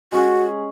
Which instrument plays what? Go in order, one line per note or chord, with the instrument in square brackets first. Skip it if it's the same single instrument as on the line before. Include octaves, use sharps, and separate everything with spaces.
[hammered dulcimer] G#3 C#4 G#4 [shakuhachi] F#4